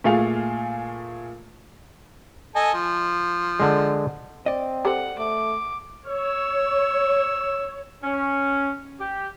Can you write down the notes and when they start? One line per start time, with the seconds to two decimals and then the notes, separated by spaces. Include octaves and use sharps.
0.04 A#2 A3 G#4 F5 F7
2.55 A4 D#5 G#5
2.73 F3
3.60 D3 G#3
4.46 C4 D5 D#5
4.85 G4 A4 C5 F#5
5.18 A3 D6
6.07 C#5 E6
8.04 C#4
9.00 G4